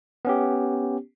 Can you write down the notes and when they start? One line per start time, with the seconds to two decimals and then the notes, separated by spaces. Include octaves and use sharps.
0.25 B3 C#4 G4